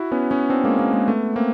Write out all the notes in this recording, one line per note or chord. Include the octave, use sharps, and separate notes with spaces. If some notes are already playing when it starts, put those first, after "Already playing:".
Already playing: E4 F#4
B3 C#4
B3 C#4
C4 D4
G#3 A#3
G#3 A#3
G#3 A#3
A3 B3
A#3 C4